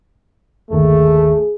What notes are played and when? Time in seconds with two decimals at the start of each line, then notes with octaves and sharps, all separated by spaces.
0.70 G1 D#2 D#3 A3 G#4